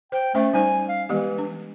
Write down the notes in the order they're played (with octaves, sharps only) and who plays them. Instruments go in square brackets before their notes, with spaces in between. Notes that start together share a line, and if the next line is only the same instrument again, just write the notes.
[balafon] C5 [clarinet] G5
[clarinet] A3 [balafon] C#4 C5 E5
[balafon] G3 D#4 C5 [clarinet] G#5
[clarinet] F5
[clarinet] E3 [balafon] G#3 B3 G4
[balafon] D4